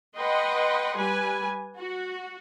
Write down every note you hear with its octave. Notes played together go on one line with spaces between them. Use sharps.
B4 D#5 F#5 G5 C6
G3 B4 G#5
F#4